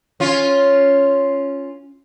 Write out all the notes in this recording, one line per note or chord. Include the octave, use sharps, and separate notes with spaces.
C#4 F4